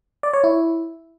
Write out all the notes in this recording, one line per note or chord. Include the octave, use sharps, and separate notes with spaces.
D5
C#5
E4